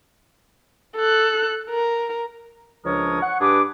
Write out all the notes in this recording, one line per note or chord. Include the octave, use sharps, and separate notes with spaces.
A4 F#6
A#4
C#2 F3 D4 A#4 C#5 D#6
F#5 C#6
G2 D4 G4 G#4 B4 D6